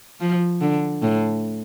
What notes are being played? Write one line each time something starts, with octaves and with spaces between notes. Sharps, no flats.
F3
D3
A2